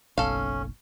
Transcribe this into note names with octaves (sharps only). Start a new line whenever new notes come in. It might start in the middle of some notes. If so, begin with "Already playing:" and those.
F#1 B1 C#4 A4 F5